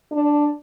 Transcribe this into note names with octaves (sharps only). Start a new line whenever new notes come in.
D4